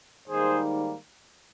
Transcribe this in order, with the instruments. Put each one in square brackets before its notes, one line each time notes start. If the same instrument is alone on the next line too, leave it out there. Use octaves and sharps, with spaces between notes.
[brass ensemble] G#2 D#3 G3 A#3 D#4 G#4 C5